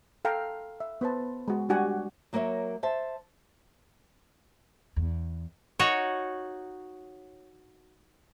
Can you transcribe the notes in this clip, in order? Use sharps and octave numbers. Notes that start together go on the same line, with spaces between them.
A4 F5 G5 A#5
E5
B3 B4 C5 A5
G#3 F#4
G3 D4 F#4 G4 F#5 G#5
F#3 A#3 A#4 C#5 E5
C5 E5 A5
E2
D#4 F#4 C#5